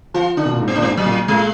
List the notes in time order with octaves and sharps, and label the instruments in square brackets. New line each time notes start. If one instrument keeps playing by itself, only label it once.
[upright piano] F3 [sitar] F4
[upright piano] D#3 [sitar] D4
[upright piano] B2
A#2
G#2
[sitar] B3
[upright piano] A#2 [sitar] D4
[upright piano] G#2 [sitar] B3
[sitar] F#3
[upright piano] A#2
[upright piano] A#2 [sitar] G#3